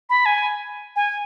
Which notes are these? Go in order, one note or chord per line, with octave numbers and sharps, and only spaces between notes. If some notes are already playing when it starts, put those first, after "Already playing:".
B5
G#5
G#5